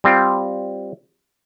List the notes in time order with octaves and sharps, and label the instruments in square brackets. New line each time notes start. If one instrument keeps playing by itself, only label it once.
[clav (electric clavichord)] G3 C4 F4